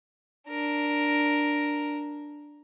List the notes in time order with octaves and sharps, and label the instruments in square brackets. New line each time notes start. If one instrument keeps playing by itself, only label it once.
[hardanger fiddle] D4 A#4